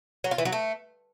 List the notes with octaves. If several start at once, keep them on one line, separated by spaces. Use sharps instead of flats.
F#3
F4
E3
F#3
A3